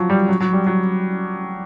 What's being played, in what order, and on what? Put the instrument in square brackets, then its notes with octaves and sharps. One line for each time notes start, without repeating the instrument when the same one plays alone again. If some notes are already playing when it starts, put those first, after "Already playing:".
Already playing: [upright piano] F3 F#3
G3
F#3
F#3
G3
F#3